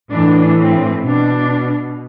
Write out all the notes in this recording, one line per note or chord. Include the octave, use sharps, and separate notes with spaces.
A2 E3 D4
C4
B2 D4